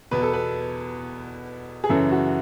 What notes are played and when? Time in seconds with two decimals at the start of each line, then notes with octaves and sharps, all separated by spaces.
0.11 E2 B2 B4
0.22 A4
0.33 B4
1.84 G#4
1.89 F#2 C#3 E3 A4
2.11 F#4